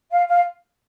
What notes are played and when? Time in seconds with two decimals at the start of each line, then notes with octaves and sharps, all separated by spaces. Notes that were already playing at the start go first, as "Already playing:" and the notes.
0.11 F5
0.28 F5